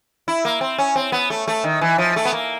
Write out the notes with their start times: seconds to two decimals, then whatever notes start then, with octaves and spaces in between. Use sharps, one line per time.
0.28 E4
0.45 A#3
0.61 C4
0.78 C#4
0.96 C4
1.12 B3
1.30 A3
1.48 A3
1.64 D#3
1.81 E3
1.98 F3
2.16 A3
2.25 B3
2.33 A#3